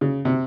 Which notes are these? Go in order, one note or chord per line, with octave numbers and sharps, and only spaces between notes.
C#3
C3